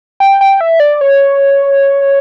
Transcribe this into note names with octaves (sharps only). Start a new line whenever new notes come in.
G5
G5
E5
D5
C#5